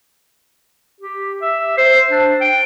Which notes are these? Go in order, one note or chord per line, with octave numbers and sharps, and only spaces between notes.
G4
E5
C5
D4
G5